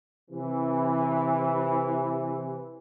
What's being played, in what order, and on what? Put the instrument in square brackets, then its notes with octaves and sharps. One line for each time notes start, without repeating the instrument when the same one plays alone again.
[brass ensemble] C3 E3